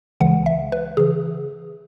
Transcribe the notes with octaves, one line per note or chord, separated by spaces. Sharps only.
C#2 C#3 E3 G#3 F#5
E5
B4
C#3 E3 G#4